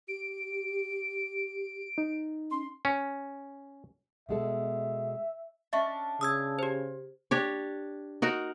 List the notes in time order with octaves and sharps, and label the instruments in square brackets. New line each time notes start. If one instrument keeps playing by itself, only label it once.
[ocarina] G4 [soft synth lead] D7
[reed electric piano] D#4
[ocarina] C#4 [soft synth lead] C6
[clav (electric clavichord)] C#4
[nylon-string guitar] B2 G#3 A4 [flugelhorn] E5
[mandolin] C#4 D4 [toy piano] D#5 E5 C#6
[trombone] C#3 [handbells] D#6 E6 G#6
[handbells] G4 C5
[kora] D4 G4 C#5
D#4 F#4 A#4